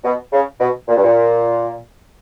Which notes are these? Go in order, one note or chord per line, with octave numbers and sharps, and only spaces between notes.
B2
C#3
B2
A#2
G2
A#2